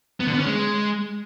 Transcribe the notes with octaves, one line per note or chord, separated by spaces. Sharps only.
B3
D3
B3
C#4
G#3